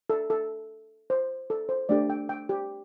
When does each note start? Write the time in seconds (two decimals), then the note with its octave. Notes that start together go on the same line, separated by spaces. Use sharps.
0.10 A4
0.30 A4
1.10 C5
1.50 A4
1.69 C5
1.89 A3 D4 G4 D5
2.10 G5
2.29 G5
2.49 G4